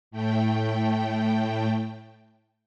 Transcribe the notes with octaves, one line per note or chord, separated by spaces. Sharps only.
A2 A3 G5